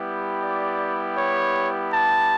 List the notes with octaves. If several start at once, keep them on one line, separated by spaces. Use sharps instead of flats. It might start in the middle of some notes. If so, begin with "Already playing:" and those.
Already playing: G3 B3 E4 G4
D5
C#5
A5